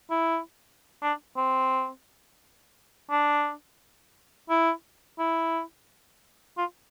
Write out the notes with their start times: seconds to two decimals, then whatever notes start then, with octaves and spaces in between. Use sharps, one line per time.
0.10 E4
1.02 D4
1.37 C4
3.11 D4
4.50 E4
5.19 E4
6.57 F4